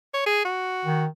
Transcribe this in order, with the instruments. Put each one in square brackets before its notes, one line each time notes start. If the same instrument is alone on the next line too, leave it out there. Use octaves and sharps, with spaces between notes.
[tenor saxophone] C#5
G#4
F#4
[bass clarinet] D#3